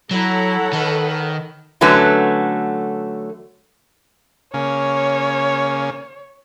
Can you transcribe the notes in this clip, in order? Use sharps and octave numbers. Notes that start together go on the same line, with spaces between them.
F#3 E4 A4 C#5 F#5 A#5
D#3 B4
D3 F#3 A3 C#4 F#4 B4
C#3 A#3 C#4 C#5